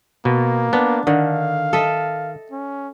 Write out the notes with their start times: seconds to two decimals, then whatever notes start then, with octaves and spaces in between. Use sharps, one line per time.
0.25 B2 A#3
0.73 B3 D4
1.07 D3 D#3 F5
1.73 A4 D#5 E5
2.51 C#4